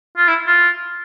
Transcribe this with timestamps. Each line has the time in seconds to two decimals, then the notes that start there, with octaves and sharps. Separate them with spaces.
0.17 F4
0.28 E4
0.47 F4